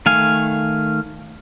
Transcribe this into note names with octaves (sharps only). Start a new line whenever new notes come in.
D#3 A3 F5 G#5